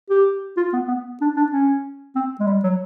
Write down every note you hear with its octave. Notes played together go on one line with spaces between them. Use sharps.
G4
F4
B3
B3
D4
D4
C#4
C4
G#3
G3
F#3